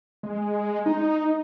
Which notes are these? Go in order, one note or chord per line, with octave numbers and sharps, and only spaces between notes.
G#3
D#4